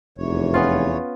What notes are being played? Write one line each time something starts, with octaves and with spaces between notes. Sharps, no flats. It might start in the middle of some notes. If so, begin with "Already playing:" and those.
F1 E2 E3 C#5
B3 C#4 F4